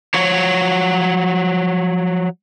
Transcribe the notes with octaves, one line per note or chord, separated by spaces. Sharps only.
F3 F#3 C#5